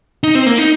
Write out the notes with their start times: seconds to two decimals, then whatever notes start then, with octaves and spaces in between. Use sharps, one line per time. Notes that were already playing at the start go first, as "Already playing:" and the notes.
0.24 D#4
0.35 C4
0.46 A#3
0.58 D#4